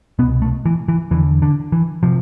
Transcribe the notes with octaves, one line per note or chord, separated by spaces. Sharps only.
C2 B2 B3
A3
E3
E3
E2 D3 E3
D3
E3
C3 F3